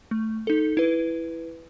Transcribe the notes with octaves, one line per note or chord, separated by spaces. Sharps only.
A3
D#4 A4
E4 B4